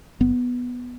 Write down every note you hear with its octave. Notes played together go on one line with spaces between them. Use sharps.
F#1 B3